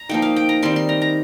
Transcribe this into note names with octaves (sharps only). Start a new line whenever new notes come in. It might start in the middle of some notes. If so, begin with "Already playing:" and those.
Already playing: A#5
F3 A#3 D#4 G5
F5
G5
A#5
D#3 G3 C4 C6
C6
A#5
A#5